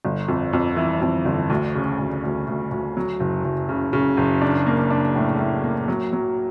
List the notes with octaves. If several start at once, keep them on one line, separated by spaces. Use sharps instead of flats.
G1
F2
F2
E3
F2
G1
D2
C#3
D2
D2
D2
D2
F#3
F#1
F#1
C#3
C#3
F#1
D4
A#3
D4
A2
A2
A#3
F#3
F#3